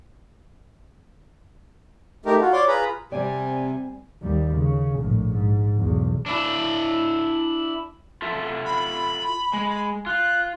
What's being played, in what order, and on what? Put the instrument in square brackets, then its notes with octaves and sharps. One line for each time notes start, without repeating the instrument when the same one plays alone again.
[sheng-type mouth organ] A3 D#4 G4 A#4
F4 F#4
C#5 D5 C6 D6
F4 G#4 B4 A#5 B5
[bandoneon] C3 [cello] G3 [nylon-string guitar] C4 D5 [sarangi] G#5
[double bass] D#2 G3
C#3
A#1 A2
G#2
B1 E2
[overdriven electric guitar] D4 E4
[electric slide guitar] F4 A4 E5
[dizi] B5
[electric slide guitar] G#3
[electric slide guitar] F4 [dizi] F#6